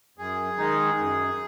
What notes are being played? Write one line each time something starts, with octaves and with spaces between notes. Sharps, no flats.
F#2 G#4
D#3 G#3 D#4
F#2